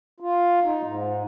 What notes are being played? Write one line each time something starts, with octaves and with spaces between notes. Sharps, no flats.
F4
D#4
G#2